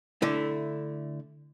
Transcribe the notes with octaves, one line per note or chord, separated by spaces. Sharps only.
D3 A3 E4